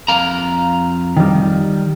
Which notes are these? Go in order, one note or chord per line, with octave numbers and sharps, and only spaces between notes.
F2 F5 A#5
D#3 G3